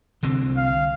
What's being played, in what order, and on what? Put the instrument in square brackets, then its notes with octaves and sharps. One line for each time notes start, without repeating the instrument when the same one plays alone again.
[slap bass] C2 D3 C4
[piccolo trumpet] F5